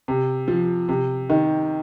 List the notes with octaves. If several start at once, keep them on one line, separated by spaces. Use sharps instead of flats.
C3
F3
C3
D#3